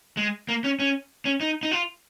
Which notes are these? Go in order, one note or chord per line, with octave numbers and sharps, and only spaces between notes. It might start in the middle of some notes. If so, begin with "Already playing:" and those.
G#3
A#3
C#4
C#4
C#4
D#4
D#4
F4